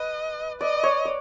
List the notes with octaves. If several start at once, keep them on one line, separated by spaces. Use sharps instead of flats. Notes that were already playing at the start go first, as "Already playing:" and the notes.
Already playing: B4 D#5
D5 D#5
C#5
D5